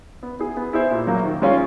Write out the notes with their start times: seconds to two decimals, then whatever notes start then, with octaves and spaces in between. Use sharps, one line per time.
0.23 B3
0.39 E4 G#4
0.57 B3
0.73 E4 G#4 C5 E5
0.91 A#2
1.07 F#3 A#3
1.24 D#3
1.42 G#3 C#4 F4